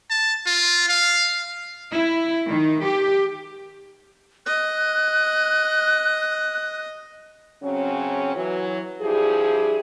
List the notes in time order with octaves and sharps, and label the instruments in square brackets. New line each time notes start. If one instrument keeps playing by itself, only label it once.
[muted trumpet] A5
F4
F5
[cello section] E4
D#3
G4
[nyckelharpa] D#5 [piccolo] F#6
[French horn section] C#3 F#3 C4 C#4
E3 F#3
G2 F3 G3 E4 G4 G#4